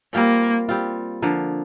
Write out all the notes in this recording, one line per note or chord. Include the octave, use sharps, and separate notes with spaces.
G3 A#3 C4 F4
G3 C4 F4
D3 F3 A#3